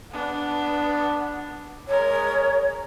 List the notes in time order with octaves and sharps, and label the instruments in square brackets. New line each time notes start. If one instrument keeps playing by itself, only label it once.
[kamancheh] B3 D4
[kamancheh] G#3 A#4 [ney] C#5